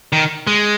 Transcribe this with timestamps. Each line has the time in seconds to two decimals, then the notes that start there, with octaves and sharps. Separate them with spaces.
0.13 D#3
0.47 G#3